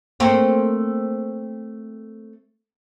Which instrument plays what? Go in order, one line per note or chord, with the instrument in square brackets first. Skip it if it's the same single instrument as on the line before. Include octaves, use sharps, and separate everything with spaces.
[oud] A3 A#3 C4